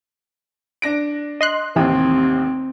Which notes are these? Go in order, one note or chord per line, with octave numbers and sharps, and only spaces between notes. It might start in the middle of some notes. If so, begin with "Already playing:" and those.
D4 A#6 D7
D#5 C6 F#6
A1 D#2 C3 E3 C4